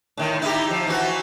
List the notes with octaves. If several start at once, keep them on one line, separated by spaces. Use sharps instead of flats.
A2 D#3
D#4 E4 G4
F3
E3 F#4